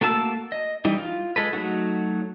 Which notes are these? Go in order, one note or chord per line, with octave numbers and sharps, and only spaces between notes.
A3 A#3 F#4 A5 E6
D#5
E3 G3 D#4
F4
G#3 A4 B4
F#3 A3 D#4 F#4